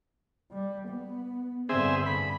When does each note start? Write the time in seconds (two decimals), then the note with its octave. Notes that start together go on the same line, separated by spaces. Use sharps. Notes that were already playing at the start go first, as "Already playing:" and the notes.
0.52 G3
0.89 B3
1.69 G2 D3 C4 G#4 E5
2.06 B5